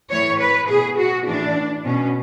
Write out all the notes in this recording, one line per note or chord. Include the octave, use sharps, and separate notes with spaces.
A2 E3 C#5
B4
B2 G#4
F#4
A2 E3 D4
B2 C#4